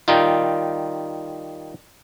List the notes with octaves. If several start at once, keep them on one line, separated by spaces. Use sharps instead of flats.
D#3 G3 D#4 F4